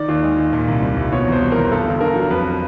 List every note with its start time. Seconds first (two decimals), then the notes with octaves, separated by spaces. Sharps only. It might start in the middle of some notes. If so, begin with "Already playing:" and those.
Already playing: D#3 D5
0.08 D#2
0.23 G#3
0.38 D#2
0.53 A#2
0.68 C2
0.82 G3
0.97 C2
1.12 B2 C#5
1.27 E2 C5
1.42 G3
1.52 E2 A#4
1.72 G2 A4
1.86 G1
2.01 D3 A#4
2.16 F#3
2.30 F2 B4